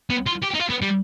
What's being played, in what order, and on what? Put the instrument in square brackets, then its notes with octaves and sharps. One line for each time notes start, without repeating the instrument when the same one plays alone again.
[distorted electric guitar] B3
F4
G4
D#4
F4
B3
G3